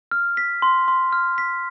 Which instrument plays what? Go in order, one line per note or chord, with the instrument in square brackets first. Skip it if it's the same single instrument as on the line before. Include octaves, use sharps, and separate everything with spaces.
[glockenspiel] F6
B6
C6
C6
F6
B6